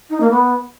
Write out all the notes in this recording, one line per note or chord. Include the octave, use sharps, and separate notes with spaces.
D#4
A#3
B3